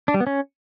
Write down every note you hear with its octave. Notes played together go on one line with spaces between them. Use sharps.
D4
G3
B3
C#4